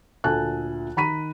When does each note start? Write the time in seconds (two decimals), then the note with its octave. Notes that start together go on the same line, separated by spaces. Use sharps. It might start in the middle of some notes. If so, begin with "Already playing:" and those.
0.24 D2 A#2 A4 G#5 A5 F#6
0.97 D#3 A#5 B5 B6 D#7